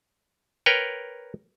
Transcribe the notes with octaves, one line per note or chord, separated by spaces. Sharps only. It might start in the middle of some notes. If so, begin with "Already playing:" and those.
A#4 B4 C#5 G5